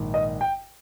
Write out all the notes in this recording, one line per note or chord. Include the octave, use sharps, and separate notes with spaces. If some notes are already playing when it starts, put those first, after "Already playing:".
Already playing: A#1 G#2 D#3
D#5
G5